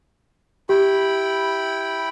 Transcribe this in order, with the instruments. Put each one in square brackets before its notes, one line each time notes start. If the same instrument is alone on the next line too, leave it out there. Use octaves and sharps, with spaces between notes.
[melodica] E4 G5 B5 [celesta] G4